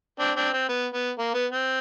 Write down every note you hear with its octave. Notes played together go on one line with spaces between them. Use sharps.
C4 D4
C4 D4
C4
B3
B3
A#3
B3
C4